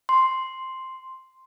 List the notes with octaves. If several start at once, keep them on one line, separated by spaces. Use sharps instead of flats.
C6